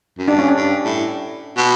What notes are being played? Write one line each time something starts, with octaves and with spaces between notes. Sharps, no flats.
F#2
G2 D4
C#4
D4
G2
A2
B2